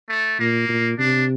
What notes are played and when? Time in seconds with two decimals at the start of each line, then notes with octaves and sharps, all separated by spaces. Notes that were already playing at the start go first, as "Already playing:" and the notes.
0.09 A3
0.39 A#2 A#3
0.69 A#2
0.99 C3 D4